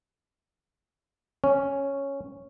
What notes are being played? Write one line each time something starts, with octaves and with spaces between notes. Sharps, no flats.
C#4